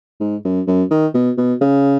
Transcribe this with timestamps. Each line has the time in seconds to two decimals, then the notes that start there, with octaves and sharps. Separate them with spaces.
0.20 G#2
0.45 F#2
0.67 F#2
0.91 D#3
1.14 B2
1.38 B2
1.61 C#3